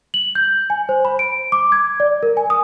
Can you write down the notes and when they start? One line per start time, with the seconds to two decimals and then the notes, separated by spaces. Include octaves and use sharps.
0.14 F#7
0.35 G6
0.70 G#5
0.89 C5
1.05 B5
1.19 D7
1.52 D6
1.72 G#6
2.00 D5
2.23 A#4
2.37 G#5
2.50 D#6